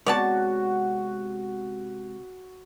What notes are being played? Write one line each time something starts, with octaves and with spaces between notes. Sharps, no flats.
C3 G#3 B3 F#4 C#5 D5 A5